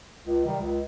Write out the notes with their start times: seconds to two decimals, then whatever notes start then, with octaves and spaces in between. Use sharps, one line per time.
0.24 C#2
0.43 C3 D#3 G3
0.60 C#2